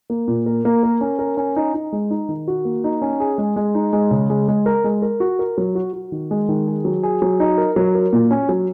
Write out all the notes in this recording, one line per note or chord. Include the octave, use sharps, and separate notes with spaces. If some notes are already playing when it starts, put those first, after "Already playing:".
A#3
A#2
A#4
A#3
A#4
C#4
A#4
C#4
D#4
D#4
G#3
D#4
D#3
F#4
A#3
D#4
C#4
G#4
G#3
G#3
D#4
G#3
C#3
G#3
G#3
A#4
G#3
A#4
F#4
A#4
F#3
F#4
F#4
D#3
G#3
D#3
G#4
F#3
G#4
F#3
D#4
A#4
F#3
A#4
A#2
C#4
F#3